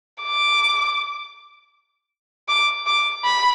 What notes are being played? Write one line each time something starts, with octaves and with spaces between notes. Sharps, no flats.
D6
D6
D6
B5